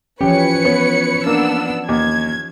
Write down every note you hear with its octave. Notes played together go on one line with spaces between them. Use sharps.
E3 F3 C#4 G4 B4 C#5 C#7
B3
A#3 B3 D4 E6
D#2 G#6